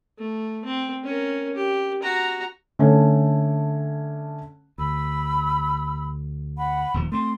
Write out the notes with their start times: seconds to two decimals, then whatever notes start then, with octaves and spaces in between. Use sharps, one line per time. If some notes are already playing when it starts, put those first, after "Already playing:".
0.19 A3
0.65 C4
1.04 C#4 A#4
1.55 G4
2.03 F#4 A#5
2.79 D3 A3 C#4
4.78 D2 B5 E6
6.57 F#5 B5
6.94 D#1 D#2 F3
7.12 A3 C4 C6 D#6